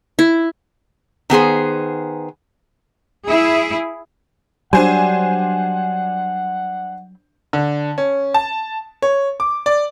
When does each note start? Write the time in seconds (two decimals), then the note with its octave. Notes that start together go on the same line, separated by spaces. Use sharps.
0.19 E4
1.30 D#3 B3 G#4 C5
3.26 E4 G#4
4.73 F#3 G3 D4 C5 F#5 G#5
7.53 D3
7.98 C#4
8.34 A5
9.02 C#5
9.40 D6
9.66 D5